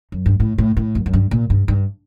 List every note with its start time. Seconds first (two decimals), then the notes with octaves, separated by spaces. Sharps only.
0.12 F#2
0.26 G2
0.40 A2
0.58 A2
0.77 A2
0.95 F#2
1.06 F#2
1.13 G2
1.31 A#2
1.50 G2
1.68 G2